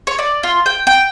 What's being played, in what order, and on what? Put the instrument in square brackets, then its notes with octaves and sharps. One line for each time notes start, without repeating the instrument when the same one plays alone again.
[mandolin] C#5
D5
F4
G5
G5